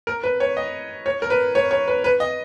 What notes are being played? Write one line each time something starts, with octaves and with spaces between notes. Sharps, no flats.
A#4
B4
C#5
D#5
C#5
A#4
B4
C#5
C#5
B4
B4
D#5